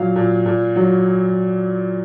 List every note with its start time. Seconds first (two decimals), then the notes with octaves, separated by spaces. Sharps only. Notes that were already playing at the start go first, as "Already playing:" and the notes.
Already playing: A#2 F#3 F5
0.16 A#2
0.46 A#2
0.76 F#3